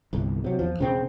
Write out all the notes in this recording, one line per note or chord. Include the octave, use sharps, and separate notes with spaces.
G1 C2
C3 F#3
E2 F3
E1 C#3 C4